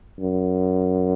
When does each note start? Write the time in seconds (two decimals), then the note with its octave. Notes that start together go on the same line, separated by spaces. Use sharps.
0.20 F#2